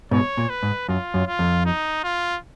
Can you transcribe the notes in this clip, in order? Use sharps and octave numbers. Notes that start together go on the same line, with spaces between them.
G#2 B2 C#5
A#2
B4
G#2
F#2 F4
F#2
F4
F2
D#4
F4